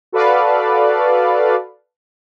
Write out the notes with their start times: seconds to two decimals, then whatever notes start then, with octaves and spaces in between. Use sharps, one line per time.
0.12 F#4 A4 B4 D5 F5